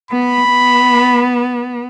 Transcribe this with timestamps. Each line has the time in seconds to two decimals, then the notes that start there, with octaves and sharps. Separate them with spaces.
0.11 B3 B5
0.49 B3